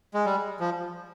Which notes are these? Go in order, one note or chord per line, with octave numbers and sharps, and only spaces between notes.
G#3
G3
F3